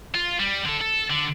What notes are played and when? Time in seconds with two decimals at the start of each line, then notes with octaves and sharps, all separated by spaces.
0.15 F4
0.40 G3
0.66 D3 A4
0.81 A4
1.10 D3